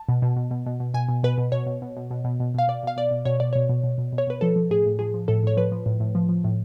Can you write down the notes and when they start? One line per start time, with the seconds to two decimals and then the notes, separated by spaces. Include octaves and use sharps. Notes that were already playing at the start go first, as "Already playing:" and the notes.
Already playing: A5
0.09 B2
0.22 B2
0.36 B2
0.51 B2
0.66 B2
0.80 B2
0.94 B2 G#5
1.09 B2
1.23 B2 B4
1.38 B2
1.52 B2 C#5
1.66 B2
1.82 B2
1.96 B2
2.11 B2
2.24 B2
2.40 B2
2.54 B2 F5
2.68 B2 D5
2.83 B2 F5
2.97 B2 D5
3.11 B2
3.25 B2 C#5
3.40 B2 D5
3.53 B2 C#5
3.69 B2
3.84 B2
3.98 B2
4.12 B2
4.18 C#5
4.27 B2 B4
4.41 F3 A4
4.56 F3
4.70 A2 G#4
4.86 A2
4.99 F3 G#4
5.14 F3
5.28 A2 A4
5.43 A2 C#5
5.57 F3 B4
5.72 F3
5.86 A2
6.00 A2
6.15 F3
6.29 F3
6.44 A2